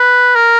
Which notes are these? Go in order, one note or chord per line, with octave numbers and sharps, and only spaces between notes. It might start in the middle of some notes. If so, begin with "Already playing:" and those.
Already playing: B4
A#4